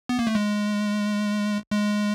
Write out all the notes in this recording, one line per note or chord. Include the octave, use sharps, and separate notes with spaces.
B3
A#3
A3
G#3
G#3